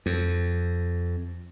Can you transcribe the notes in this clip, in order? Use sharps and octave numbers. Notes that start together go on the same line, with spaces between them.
F2